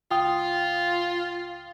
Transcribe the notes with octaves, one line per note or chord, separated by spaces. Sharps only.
C#2 F4 G5 D#6